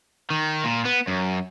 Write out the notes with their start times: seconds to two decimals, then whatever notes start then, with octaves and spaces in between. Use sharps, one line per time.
0.30 D#3
0.64 A#2
0.85 B3
1.07 F#2